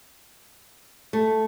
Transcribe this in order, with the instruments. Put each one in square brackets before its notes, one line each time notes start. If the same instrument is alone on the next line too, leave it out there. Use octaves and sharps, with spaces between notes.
[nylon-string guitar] A3